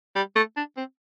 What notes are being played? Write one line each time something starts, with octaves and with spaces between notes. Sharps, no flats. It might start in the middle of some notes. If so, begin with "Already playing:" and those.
G3
A3
D4
C4